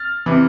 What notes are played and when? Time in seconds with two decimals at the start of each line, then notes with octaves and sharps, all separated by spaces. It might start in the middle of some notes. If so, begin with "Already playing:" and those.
Already playing: F6 A6
0.26 C3 E3